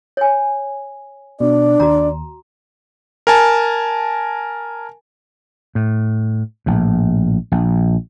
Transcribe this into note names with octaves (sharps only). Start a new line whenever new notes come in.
C#5 G#5
B2 D4 D5
D#2 F#4 A#5
A#4 G#5 A5
A2
A#1 A2
A#1